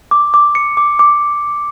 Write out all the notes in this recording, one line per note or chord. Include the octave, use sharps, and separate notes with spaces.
D6
D6
C#7
D6
D6